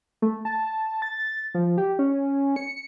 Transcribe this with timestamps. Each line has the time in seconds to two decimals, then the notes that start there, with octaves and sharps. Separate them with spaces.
0.22 A3
0.45 A5
1.02 A6
1.54 F3
1.78 G4
1.99 C#4
2.56 C#7